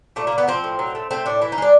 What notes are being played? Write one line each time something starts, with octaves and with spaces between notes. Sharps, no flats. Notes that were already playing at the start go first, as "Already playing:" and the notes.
A#2 A3
A#3
A#2
B3
F3 C4
A2
F#3
A3
A3 C4
A2 D4
E3 E4
D#4
G#3 D4